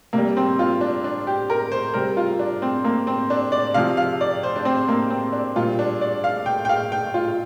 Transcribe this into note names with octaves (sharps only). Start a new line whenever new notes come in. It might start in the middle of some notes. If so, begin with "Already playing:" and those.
C3 G3 A#3
C4
F4
D4
D4
G4
A#4
C5
C3 G3 A#4
F4
D4
C4
A#3
C4
D4
D5
C3 F3 F5
F5
D5
C5
D4
C4
A#3
C4
D4
A#2 G3 F4
D4
D5
F5
G5
G5
F5
G5
F4